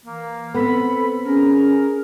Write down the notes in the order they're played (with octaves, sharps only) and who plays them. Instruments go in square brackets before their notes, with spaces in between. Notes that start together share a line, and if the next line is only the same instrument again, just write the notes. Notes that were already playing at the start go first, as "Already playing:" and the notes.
[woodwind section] E3 A#3
[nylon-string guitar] B3 C4 [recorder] A4 [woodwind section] B5
[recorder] C#4 [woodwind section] G#4 A#4